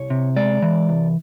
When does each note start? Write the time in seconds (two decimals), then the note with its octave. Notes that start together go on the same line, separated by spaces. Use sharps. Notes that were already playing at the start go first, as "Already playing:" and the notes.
Already playing: C2 C#5
0.10 C3
0.36 G#3 D5
0.62 E3
0.89 C2